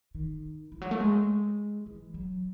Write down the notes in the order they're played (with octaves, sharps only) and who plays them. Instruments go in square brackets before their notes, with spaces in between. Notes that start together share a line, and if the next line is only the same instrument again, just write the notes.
[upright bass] D#3
E3
F#3
A3
G#3
E3
F#3